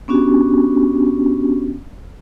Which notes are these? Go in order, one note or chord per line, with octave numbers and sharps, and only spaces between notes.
B3 C#4 D4 F#4 G4